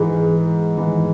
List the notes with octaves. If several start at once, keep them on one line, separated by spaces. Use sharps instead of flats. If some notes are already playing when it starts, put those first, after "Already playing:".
Already playing: G#2 E3 G#3
G#2 E3